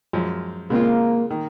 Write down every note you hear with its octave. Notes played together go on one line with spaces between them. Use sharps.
F#2 F3 G#3
C#3 G#3 A#3 C4 F4
D#3 A#3